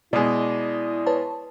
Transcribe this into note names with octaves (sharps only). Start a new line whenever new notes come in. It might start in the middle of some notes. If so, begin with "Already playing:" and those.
B2 G#3 E4 D5
B4 C#5 A5